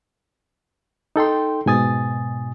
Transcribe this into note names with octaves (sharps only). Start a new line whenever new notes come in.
D#4 A4 G5 C6
G#2 B2 G#5 D#6 A6